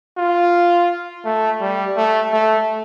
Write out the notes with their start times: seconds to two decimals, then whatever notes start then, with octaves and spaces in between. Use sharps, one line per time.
0.17 F4
1.25 A3
1.60 G3
1.97 A3
2.33 A3